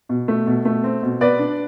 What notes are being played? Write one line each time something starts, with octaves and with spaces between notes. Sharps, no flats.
B2
A3
B2
A3
C4
B2
B3 B4 D5
D4